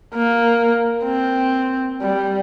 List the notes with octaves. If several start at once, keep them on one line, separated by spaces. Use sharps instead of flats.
A#3
C4
G3